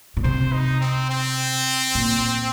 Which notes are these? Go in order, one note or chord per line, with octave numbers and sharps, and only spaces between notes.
A#2
C3 C5
D#4
C4
C4
A#2